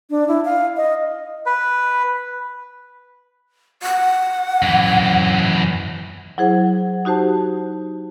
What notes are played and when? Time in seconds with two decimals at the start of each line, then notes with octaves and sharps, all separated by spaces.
0.10 D4
0.28 E4
0.45 F5
0.77 D#5
1.46 B4
3.83 F#5
4.62 F#2 E3
6.38 F#3 E4 G#4 C5 F#5
7.05 D#4 F#4 G4 C5 A5